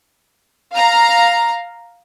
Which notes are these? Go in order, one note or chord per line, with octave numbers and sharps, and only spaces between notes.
F5 A#5